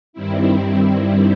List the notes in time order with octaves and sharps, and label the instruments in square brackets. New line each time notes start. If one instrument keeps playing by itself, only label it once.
[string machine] G2 D#3 G3 C4 E4